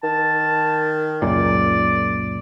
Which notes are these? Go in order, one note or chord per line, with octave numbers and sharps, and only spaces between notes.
D#3 A5
C#2 F#2 A#2 D5